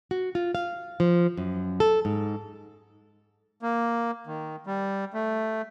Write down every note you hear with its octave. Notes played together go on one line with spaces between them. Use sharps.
F#4
F4
F5
F3
F#2
A4
G#2
A#3
D#3
G3
A3